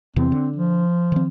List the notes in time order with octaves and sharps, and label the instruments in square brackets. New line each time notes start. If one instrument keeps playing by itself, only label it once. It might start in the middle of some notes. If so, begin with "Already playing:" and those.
[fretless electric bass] E2 C3 E3 [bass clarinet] C4
[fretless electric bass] D3
[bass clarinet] F3
[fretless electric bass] D#3 C4